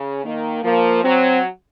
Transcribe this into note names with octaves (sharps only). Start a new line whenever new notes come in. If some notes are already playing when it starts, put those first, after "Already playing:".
Already playing: C#3
D#3 A#3
F3 A#3
F#3 C4